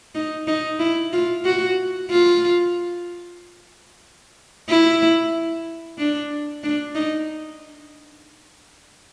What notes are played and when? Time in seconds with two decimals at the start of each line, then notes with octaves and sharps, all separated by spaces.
0.15 D#4
0.48 D#4
0.80 E4
1.13 F4
1.45 F#4
2.10 F4
4.69 E4
5.98 D4
6.64 D4
6.95 D#4